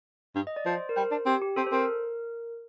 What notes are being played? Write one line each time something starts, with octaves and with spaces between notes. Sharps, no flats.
G2
D#5
D5
F3 C5
A#4
G3 C5
D4
C4 G4
G4
C4 A4
C5
C4 A#4